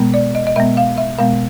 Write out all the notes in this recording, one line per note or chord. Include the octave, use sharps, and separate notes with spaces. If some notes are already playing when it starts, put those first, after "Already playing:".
Already playing: B2 G#3 B3
D5
D#5
D#5
B2 G#3 B3 E5
F5
E5
B2 G#3 B3 F5